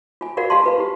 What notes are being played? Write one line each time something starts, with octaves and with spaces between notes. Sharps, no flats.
F4 G#5
F4 F#4 A#4 D5 F5 F#5
G4 F5 G#5 A5 C6
F4 B4 F5
E4 G4